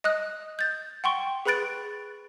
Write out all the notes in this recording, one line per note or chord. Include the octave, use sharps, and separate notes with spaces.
D#5 D#6 F#6
G6 A6
F#5 G5 C6 C#6
G#4 B4 B5 F#6 A6 D7